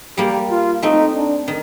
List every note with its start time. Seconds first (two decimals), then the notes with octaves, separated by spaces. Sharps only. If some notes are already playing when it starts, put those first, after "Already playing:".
0.17 G3 A#3 G4
0.51 F4
0.82 A3 C4 D#4
1.15 D4
1.48 D#3